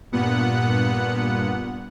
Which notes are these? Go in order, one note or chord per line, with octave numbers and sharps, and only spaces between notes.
G2 A#2 B3 F#5